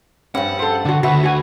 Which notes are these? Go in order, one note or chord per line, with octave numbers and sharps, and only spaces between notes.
G2 F3 C#4 F#5
A4 C5
D3 D4 F#4
D2 F#4 B4 E5
F#4 G#5